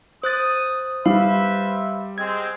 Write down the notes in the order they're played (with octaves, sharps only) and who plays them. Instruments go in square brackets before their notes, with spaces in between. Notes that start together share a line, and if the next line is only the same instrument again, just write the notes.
[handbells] C5 F#6 A6 [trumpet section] D#6
[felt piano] G3 [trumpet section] B4 C5 E5 [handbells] F5
[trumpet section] G#3 C4 [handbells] G#6